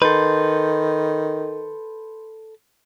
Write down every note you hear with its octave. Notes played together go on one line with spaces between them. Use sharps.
D#3 A4 B4 C6 G6